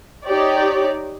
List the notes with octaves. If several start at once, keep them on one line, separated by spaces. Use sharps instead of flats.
D#4 G4 C#5 D5